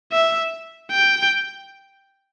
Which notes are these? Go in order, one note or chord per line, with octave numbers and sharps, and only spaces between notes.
E5
G5